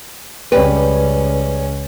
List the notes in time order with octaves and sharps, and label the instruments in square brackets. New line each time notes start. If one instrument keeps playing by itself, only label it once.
[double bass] C#2 C#4 [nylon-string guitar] G3 B4